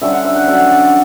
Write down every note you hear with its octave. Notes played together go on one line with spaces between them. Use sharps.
D3 G3 C#4 E5
F#5
E5
F#5
D3 F#3 C#4 E5